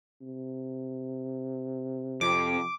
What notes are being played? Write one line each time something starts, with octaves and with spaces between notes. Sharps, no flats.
C3
F2 D6